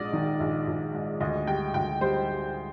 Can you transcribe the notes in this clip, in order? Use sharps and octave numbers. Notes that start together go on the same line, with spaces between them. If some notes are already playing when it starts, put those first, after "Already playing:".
Already playing: A#1 G#2 D5 D#5
D#3
A#1
A#1
G#2
D2 D#5
G3 G5
D2 G5
G3 C5
G3